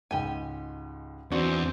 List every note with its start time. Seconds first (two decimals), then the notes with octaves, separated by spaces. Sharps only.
0.11 C#2 G#2 G4 G#5
1.32 E2 C4 D4 D#4 F#4